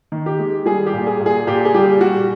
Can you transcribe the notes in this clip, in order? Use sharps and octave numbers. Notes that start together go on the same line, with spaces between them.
D#3
G4
G#3
G3 G#4
G4
A#2
G#4
A#2
G#4
A#2 G4
G#4
G3 G4
G3 F#4